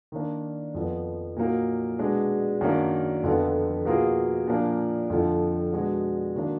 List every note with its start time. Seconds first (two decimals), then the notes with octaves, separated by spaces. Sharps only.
0.12 D#3 A#3 D4
0.74 F2 F3 B3
1.37 A#2 F#3 A#3 D#4
1.99 B2 G#3 D4 G#4
2.61 F#2 D#3 A#3 D4
3.23 F2 D3 F3 B3 F4
3.85 B2 A#3 F4 G#4
4.48 A#2 F3 A#3 D4
5.10 F2 D3 F3
5.72 B2 G#3 D4 F#4
6.36 D#3 F#3 A#3 D4